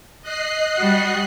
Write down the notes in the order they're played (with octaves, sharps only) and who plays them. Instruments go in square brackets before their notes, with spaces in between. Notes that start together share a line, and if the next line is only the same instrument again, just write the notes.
[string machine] D#5 F#6 C7
[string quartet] G3 F#4